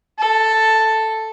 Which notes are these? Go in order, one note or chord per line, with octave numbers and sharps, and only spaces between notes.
A4